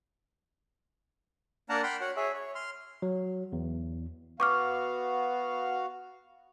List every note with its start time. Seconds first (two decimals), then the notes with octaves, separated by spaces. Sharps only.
1.69 A#3 D4 A#4 F#5 A5 A#5
1.83 F#5 G5 B5 C6 F6
2.01 F#4 C#5 F#5
2.16 G#4 C#5 E5
2.34 C#5
2.55 C6 F6
3.02 F#3
3.53 E2
4.40 B3 F#4 F5 C#6 D6 F6